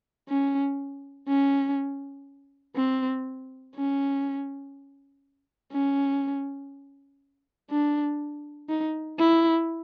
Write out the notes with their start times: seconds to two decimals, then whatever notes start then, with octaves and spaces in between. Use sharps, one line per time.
0.29 C#4
1.28 C#4
2.76 C4
3.76 C#4
5.72 C#4
7.71 D4
8.69 D#4
9.19 E4